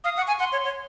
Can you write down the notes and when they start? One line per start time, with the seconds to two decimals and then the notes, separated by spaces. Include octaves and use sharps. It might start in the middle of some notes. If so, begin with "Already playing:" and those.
0.04 F5 D#6
0.17 F#5
0.22 C#6
0.28 G#5
0.39 F#5 C6
0.52 C#5
0.64 C#5